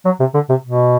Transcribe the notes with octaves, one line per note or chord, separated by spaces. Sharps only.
F#3
C3
D3
C3
B2